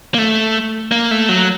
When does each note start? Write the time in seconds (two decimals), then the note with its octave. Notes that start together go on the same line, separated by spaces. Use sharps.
0.14 A#3
0.19 A3
0.92 A#3
1.11 A3
1.29 F#3